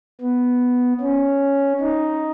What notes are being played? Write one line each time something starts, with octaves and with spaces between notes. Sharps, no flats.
B3
C#4
D#4